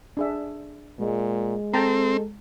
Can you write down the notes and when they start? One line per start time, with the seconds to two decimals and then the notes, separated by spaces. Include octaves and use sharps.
0.17 D4 G#4 E5
0.99 A#2 G#3
1.73 C4 A4 G5 A5 A#5